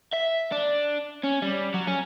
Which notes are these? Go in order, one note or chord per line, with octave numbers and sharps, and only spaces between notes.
E5
D4
C#4
G3
F#3
C#4